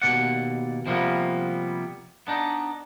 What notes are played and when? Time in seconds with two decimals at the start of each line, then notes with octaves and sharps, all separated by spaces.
0.02 D#2 B2 D5 F#5
0.86 C3 F3 G3 A#3 B3
2.27 B3 D4 D#4